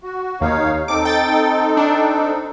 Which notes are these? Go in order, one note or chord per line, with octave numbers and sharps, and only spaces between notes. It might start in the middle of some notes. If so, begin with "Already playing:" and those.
F#4
D#2 D#4 C#5 F5
C4 D#4 A4 D6
G5 A6
D4